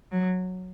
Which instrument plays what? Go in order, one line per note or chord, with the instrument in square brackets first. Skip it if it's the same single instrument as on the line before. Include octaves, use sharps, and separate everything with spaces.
[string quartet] F#3